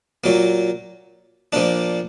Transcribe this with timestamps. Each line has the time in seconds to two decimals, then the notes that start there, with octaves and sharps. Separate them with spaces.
0.24 A#2 F#3 A#3
1.53 A#2 F3 A#3 D4